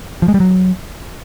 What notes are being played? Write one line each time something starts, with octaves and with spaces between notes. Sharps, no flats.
F3
G#3
G3
F#3